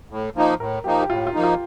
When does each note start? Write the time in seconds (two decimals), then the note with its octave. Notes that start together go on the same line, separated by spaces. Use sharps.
0.10 A2
0.35 F3 A#3 D#4
0.59 A2 A#4
0.84 F3 A#3 D#4 G4
1.00 G4
1.09 A2 F4
1.27 F4
1.34 F3 A#3 D#4
1.43 F4